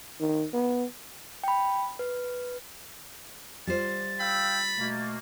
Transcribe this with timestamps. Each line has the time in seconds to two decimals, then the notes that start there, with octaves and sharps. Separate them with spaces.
0.20 D#3
0.53 B3
1.44 G5 B5
1.99 B4
3.67 G3 F4 C5 A6
4.20 F5 G5 B5 E6
4.78 B2 A3 A#3